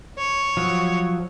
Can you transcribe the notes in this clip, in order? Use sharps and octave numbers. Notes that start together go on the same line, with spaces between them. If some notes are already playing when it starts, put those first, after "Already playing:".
C#5
F3 F#3